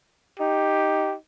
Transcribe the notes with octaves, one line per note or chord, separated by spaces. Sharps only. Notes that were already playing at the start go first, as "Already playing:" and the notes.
D#4 G4